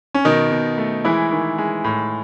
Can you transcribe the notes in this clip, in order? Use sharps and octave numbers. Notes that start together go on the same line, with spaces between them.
C#4
B2 D#3 D#4
B2
A3
E3 G#3 E4
D#3
G#3
A2